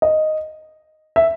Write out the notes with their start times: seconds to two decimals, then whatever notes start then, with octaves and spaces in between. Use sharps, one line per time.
0.02 D#5
1.16 E5